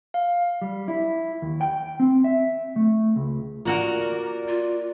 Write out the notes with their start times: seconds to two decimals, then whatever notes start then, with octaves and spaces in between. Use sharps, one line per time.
0.14 F5
0.62 G3
0.88 E4
1.42 D#2
1.61 G5
2.00 C4
2.24 E5
2.76 A3
3.16 C#2
3.65 A#3 F4 F#4 A#4 D5
4.48 F4